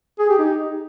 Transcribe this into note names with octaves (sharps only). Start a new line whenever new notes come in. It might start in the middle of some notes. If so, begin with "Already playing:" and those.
G#4
G4
D#4